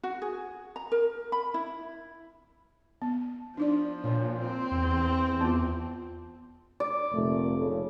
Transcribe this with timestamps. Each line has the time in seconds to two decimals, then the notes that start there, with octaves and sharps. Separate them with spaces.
0.03 F#4
0.22 G#4
0.76 A#5
0.92 A#4
1.32 B5
1.54 E4
3.02 B3
3.57 F3 D4 D#4 D5
4.04 A#2 C#5
4.40 C4
4.71 E2
5.41 B3 F4
6.80 D5
7.13 F1 A#2 A3
7.58 C#3 A4